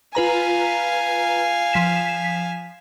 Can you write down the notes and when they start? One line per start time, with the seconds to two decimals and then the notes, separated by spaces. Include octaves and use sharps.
0.15 F4 B4 F5 G#5 A#5
1.73 F3 B6 E7